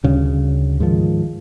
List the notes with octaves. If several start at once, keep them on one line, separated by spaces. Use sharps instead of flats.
D2 C#3 G3
G#2 D#3 F3